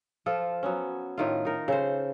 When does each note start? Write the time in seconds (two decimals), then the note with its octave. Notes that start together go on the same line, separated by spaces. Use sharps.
0.26 F3 F4 A4
0.63 F#3 B3 C#4
1.18 A2 D#3 F4
1.45 D#4 A#4
1.68 C#3 A4 C5